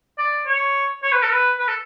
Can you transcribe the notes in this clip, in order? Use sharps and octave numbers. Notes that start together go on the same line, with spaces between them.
D5
C#5
C#5
B4
A4
B4
B4
A4